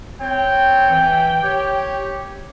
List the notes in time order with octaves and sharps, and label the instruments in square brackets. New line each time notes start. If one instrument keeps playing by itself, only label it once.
[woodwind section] C4 C#5 [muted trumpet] G5
[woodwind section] E3
G4 C#5